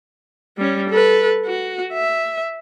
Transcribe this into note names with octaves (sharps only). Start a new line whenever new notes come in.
G3 C#4
A4 B4
F#4
E5